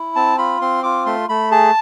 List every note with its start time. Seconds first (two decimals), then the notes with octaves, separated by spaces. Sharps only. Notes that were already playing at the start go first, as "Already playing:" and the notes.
Already playing: E4
0.16 C4 A5
0.38 F4 B5
0.61 C4 C6
0.83 F4 D6
1.06 A3 C6
1.29 A3 B5
1.51 G#4 A5